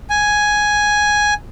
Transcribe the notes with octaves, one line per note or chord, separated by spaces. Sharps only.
G#5